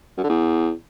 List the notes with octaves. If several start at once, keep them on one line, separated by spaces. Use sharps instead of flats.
F#2
D3
E2